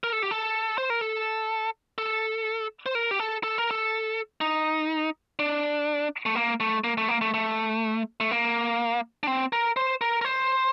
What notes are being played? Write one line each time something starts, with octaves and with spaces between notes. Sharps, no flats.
A#4
A4
G4
A4
C5
A#4
A4
A4
C5
A#4
G4
A4
A4
A#4
A4
D#4
D4
A3
A#3
A3
A#3
A3
A#3
A3
A3
A3
A#3
D4
C4
A#4
C5
A#4
A#4
C5